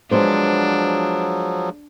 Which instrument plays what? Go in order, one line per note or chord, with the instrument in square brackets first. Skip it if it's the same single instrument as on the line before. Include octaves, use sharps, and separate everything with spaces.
[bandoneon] F3 F#3 [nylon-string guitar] G#3 B3 C5 [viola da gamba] D4